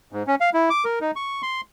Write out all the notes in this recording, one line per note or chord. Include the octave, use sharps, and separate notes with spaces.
G#2
C#4
F5
E4
D6
A#4
D#4
C#6
C6